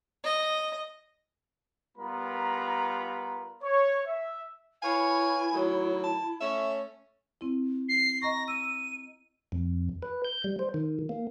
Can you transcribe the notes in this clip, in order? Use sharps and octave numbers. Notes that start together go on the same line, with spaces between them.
D#5
G3 B3 F4 A#4 A#5 B5
C#5
E5
E4 B4 C#5 F5 G#5
A2 D#3 F#3
A5
A3 C#4 E5
C4 E4
C7
D#5 A#5 C#6 A#6
E6 D#7
F2
B4
G6
G3
C5
D#3
A#3